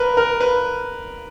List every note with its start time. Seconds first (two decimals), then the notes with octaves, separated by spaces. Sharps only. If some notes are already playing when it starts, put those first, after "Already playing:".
Already playing: A#4 B4
0.17 A#4
0.40 B4